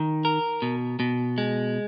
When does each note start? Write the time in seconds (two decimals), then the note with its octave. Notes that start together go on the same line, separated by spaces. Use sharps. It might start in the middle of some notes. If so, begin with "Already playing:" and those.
Already playing: D#3
0.25 A#4
0.62 B2
1.00 B2
1.38 G#3